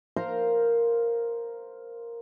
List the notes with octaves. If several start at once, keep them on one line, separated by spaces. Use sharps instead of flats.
A#4 C5 F5 A#5